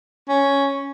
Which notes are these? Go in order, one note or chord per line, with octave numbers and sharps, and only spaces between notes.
C#4